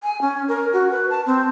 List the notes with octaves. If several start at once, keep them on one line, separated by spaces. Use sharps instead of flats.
G#5
C#4
A#4
F#4
B4
A5
C4